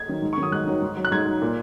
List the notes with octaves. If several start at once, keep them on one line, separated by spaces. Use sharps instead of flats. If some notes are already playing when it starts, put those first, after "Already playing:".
Already playing: G#6
D#3 F#3
G#2
C#6
D#3 F#3 D#6
G#2 F#6
D#3 F#3
G#2
F#3
F#6
G#2 G#6
F#3
A#2